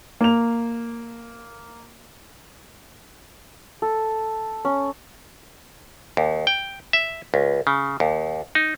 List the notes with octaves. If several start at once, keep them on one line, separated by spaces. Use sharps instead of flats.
A#3 F7
A4
C#4
D#2
G5
E5
C#2
C#3
D#2
D#4